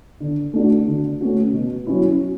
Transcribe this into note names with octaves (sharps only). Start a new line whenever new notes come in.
D3
A3 D4 F#4
D3
A3 C#4 F#4
B2
F#3 C#4 E4